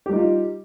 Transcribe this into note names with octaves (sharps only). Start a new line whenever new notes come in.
G3 D#4 F4 G4